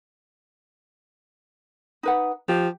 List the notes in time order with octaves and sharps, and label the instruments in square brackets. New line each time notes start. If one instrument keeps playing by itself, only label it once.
[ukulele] D#4 B4 F#5
[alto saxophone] F3 [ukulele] G4